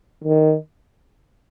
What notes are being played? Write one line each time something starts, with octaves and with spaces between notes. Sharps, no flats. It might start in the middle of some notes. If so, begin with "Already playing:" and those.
D#3